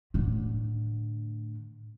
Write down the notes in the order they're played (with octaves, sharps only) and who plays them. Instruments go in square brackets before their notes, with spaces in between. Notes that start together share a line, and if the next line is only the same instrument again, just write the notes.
[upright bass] A2 D3